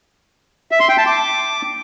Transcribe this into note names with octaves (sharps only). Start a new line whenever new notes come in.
E5
C6
G5
A5
D6